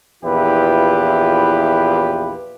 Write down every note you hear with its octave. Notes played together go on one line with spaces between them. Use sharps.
A#1 E2 E4 F4 G4 B4